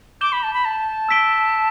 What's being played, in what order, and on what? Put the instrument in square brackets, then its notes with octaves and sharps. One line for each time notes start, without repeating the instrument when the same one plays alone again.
[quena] D6 [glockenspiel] G6 E7 G7
[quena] B5
A5
B5
A5
[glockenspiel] E6 B6 D7 G7